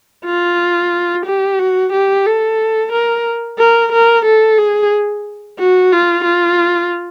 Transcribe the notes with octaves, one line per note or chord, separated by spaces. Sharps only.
F4
G4
F#4
G4
A4
A#4
A#4
A#4
A4
G#4
F#4
F4
F4